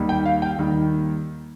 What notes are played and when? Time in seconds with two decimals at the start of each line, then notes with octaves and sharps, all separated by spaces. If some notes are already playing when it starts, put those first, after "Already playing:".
Already playing: D#2 D#3 G3
0.09 G5
0.26 F5
0.42 G5
0.59 D#2 D#3 G3